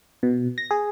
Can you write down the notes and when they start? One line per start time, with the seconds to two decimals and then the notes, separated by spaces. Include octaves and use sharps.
0.23 B2
0.58 A#6
0.71 G#4